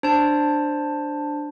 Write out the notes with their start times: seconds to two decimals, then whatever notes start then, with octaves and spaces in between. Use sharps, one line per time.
0.03 D4 C5 A5